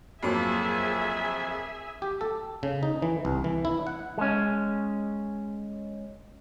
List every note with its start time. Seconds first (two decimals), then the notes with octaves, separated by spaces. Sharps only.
0.23 F2 F#3 A#3 G#4 E5 G#5
2.02 G4
2.21 A4
2.63 C#3
2.83 D#4
3.02 E3
3.25 C2
3.44 E3
3.65 E4
3.87 F#5
4.18 G#3 C#4